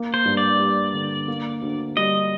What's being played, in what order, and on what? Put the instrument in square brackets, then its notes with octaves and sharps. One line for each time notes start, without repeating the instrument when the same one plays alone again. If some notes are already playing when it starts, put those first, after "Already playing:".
Already playing: [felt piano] A#3
[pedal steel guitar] C5
[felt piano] G2
[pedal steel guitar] D5
[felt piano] G3
D3
A#3
D2
[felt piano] G3 [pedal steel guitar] D#5